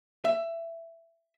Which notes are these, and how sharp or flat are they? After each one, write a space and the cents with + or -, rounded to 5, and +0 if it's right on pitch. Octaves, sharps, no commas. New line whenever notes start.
E5 +15